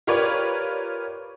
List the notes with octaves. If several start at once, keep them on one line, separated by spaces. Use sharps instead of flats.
F4 G4 A#4 B4 C#5 D5